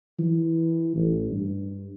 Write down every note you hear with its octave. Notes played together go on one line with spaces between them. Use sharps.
E3
A1
G2